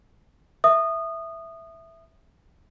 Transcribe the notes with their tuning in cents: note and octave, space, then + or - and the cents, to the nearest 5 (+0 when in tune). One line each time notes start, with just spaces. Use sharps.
E5 +0 D#6 -20